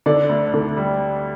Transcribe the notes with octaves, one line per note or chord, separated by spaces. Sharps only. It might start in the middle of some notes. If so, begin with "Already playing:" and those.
D3 D5
D2
D3
G3